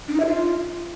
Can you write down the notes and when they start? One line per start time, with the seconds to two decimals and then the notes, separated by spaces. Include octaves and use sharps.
0.08 D4
0.14 D#4
0.20 E5
0.26 F4